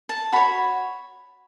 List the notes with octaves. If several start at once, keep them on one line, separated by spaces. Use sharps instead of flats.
A5
F#4 C#5 B5